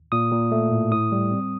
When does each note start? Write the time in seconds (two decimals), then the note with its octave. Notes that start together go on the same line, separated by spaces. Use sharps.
0.12 A#2 D#6
0.32 A#2
0.51 A3
0.71 A2
0.92 A2 D#6
1.12 G3
1.32 C4